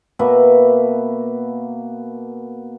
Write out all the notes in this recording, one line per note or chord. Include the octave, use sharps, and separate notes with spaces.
B2 A#3 B4 E5